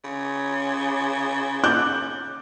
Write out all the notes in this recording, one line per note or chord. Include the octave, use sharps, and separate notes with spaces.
C#3
D6 F#6 G6